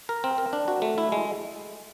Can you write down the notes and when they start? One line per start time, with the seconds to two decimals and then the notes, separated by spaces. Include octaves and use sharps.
0.09 A#4
0.24 C4
0.38 A#4
0.53 D4
0.68 F#4
0.82 A3
0.98 E4
1.12 G#3